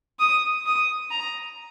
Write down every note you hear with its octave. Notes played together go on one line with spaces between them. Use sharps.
D#6
D#6
A#5